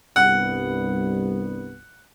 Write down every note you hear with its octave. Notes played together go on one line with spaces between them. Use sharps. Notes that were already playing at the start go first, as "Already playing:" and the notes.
C2 G2 B3 F#5